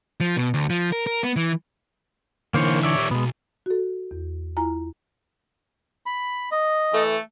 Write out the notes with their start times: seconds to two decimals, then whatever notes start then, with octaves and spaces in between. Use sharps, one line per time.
0.20 F3
0.37 B2
0.54 D2
0.70 F3
0.92 A#4
1.07 A#4
1.23 B3
1.36 E3
2.54 D3 E3 A#3 C5 C#5
2.83 C#5 D5 E5
2.96 D#3 G3
3.11 B1 G#3 B3
3.66 F#4 A4
4.11 E2
4.57 E4 F4 G#5 A#5
6.06 B5
6.51 D#5
6.93 E3 A3